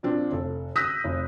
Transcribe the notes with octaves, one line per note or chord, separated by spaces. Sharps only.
A#2 F3 C4 D4
F1 A4
D#6 E6 F#6 G6 A#6 B6
F1